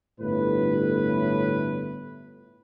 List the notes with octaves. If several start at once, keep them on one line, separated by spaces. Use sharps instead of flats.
G1 A2 B4